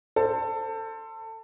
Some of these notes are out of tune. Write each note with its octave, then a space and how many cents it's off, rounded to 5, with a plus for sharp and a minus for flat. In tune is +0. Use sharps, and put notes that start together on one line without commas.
A4 +20 C5 +0